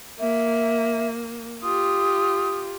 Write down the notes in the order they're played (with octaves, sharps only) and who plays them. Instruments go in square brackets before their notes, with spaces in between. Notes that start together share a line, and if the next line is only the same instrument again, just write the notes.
[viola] A#3 [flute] E5
[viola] F4 G4 [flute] D#6